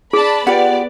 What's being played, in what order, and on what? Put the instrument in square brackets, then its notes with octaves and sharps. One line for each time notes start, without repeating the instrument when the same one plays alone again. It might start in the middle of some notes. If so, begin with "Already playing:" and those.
[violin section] D4 A5 B5 [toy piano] G#4
[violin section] B3 D5 [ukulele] F4 G4 F#5